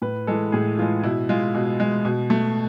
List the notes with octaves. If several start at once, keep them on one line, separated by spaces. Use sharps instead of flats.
A2 B4
E3 G#3 A4
A2 G#4
E3 G#3 F4
B2 E4
G#3 F4
B2
G#3
B2
A3